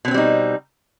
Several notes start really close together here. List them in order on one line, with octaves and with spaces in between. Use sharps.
B2 C#4 C4 G3 D#4